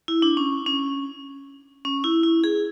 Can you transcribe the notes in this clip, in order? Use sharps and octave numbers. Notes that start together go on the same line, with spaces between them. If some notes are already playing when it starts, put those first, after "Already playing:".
E4
D4
C#4
C#4
C#4
E4
E4
G#4